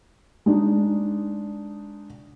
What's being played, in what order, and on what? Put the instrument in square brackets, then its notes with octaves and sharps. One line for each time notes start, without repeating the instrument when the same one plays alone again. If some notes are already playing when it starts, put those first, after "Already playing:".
[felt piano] G#3 D4 D#4